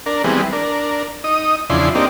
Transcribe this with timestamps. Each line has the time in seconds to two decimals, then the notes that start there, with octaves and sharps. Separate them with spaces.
0.06 D4 A#4
0.24 E3 G3 G#3 B3 C4
0.53 D4 A#4
1.24 D#4 D#6
1.70 E2 C#3 F3 D4 E4 C6
1.95 A#3 C4 D4 D#4 G4